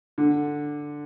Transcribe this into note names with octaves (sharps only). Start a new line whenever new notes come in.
D3